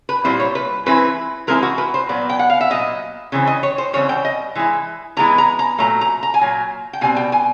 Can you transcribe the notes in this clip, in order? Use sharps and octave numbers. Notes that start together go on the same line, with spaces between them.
B4
A#2 G3 C4 E4 C5
C#5
B4
E3 G#3 C4 E4 B4
E3 G#3 C4 E4 A#4
F#4
B4
C5
A#2 F#3 B3 D5
G5
F#5
F5
E5
A#2 F#3 B3 D#5
C#3 E3 C4
D#5
C#5
C5
C#3 E3 G3 C4 C#5
G5
D#5
E3 G#3 E4
E3 G#3 B3 E4 A#5
A#5
A#5
A#2 F#3 A3 A#5
A#5
A#5
G#5
A#2 F#3
G5
B2 G3 C4 G#5
G5
G#5